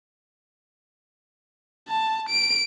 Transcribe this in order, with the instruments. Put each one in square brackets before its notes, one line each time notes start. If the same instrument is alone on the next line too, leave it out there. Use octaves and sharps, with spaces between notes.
[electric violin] A5
D7